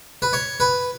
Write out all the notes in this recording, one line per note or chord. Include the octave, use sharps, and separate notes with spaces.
B4
C#5
B4